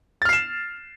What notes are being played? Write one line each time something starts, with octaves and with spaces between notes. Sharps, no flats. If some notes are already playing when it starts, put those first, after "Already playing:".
F6 A6 C7 E7